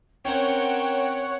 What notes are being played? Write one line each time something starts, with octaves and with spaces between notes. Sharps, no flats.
C4 C#4 A#4 C#5 F#5 G5